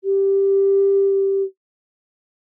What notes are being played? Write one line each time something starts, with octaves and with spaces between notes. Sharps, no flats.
G4